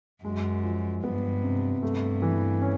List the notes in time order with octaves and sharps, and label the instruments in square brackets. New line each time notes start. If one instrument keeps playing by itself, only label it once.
[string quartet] F#2 [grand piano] G#3
[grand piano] F3
[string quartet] G2 [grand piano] B3
[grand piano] C3
[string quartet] G2 [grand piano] A3
[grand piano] E3
C#4